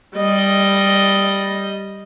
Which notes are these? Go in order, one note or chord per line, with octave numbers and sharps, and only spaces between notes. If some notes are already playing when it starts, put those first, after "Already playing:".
G3 D#5